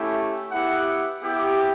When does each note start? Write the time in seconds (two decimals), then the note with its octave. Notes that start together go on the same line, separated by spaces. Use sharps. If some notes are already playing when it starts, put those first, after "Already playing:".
Already playing: A3 C#4 E4 G4
0.51 B3 E4 G4 F#5
1.23 B3 E4 G4